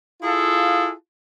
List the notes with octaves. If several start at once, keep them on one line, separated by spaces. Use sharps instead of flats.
E4 F4 G#4 A4 F5